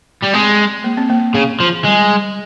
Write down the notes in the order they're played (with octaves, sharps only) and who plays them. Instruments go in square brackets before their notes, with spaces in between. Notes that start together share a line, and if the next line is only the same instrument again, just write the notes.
[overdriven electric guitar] G3
[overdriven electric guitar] G#3 [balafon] C4
[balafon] A#3
C4
A#3
[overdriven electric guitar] C#3
F3
[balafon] G3 [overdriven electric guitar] G#3